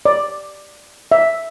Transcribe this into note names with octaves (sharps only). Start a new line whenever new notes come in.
D5
E5